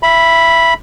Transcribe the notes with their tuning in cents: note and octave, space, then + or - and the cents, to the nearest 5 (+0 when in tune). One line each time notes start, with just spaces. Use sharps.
E5 +20 B5 -5